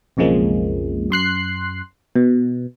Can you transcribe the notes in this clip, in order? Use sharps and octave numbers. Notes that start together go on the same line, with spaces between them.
B1 F2 C#3 F3 G#3 A#3
F#2 C6 F#6 C7
B2